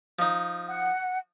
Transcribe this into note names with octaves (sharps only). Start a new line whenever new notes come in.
F3 D#4
F#5